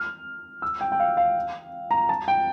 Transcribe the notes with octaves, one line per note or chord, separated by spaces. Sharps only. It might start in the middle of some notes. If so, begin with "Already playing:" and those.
Already playing: F6
E6
G5
G5
F5
F5
A#5
A5
G5